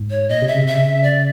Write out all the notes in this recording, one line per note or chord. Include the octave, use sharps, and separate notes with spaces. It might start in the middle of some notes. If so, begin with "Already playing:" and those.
Already playing: G#2
C#5
A#2 D#5
C3
E5
C#3
C3 E5
C#3
D5